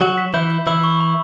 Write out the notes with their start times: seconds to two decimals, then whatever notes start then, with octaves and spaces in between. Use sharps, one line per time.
0.01 F#3 F#4 E7
0.18 B6
0.34 E3 E4 G6
0.50 G6
0.67 E3 E4 E6
0.83 C#6
1.00 B5